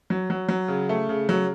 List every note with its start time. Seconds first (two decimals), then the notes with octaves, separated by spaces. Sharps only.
0.10 F#3
0.30 F#3
0.49 F#3
0.68 C#3
0.89 A3
1.09 C#3
1.29 F#3